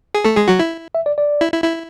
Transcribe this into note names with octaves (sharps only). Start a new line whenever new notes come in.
G#4
A3 A4
G#3 G#4
F#3 F#4
E4
E5
D5
D5
E4
E4
E4